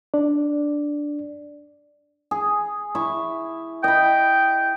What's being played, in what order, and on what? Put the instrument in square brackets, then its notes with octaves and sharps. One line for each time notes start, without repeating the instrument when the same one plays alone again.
[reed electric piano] D4 D5
[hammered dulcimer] G#4
E4 C#6
[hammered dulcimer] D#5 B5 [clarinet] G5